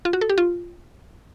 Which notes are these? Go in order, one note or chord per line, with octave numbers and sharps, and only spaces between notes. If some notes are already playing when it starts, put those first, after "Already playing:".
F4
F#4
A4
G4
F4